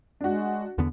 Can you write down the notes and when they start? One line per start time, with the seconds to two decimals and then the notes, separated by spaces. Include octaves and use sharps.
0.21 G#3 D4 F#4
0.78 E2 D3 B3